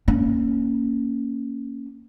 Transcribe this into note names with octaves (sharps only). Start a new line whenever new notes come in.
A#3 C#4